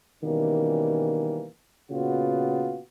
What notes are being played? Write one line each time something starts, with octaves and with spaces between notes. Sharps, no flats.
B2 D#3 E3 G3 A#3 C#4
A#2 C#3 B3 F4 F#4